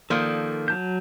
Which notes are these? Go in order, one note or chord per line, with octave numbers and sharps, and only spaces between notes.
D#3 F3 A#3 A4 D5 D#6
F#3 A5 G6